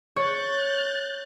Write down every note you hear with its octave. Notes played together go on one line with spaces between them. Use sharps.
C#5 F#6 G6 A6